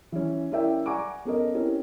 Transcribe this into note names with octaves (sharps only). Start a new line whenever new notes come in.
E3 C#4
C#4 E4 A#4 D5 E5 G5
D5 F#5 G#5 A#5 C#6 D6
B3 C#4 A4 A#4 D#5
C4 C#4 E4 G4 A#4